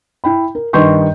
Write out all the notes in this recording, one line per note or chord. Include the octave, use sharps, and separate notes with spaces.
E4 G5 B5
A#4
G2 D#3 B4 C6 C#6 G6